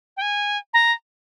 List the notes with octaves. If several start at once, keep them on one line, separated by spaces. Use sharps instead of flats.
G5
G#5
A#5